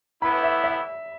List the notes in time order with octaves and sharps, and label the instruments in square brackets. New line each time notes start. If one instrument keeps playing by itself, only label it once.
[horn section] A2 E3 B3 E4 [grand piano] B5
[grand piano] E5
E5